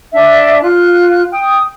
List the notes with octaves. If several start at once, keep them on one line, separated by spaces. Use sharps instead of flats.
D4 E5
F4 F#6
G5 D#6